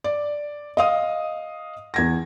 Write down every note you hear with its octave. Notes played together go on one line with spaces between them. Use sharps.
D5
D#5 F5 D#6
E2 G#6 A#6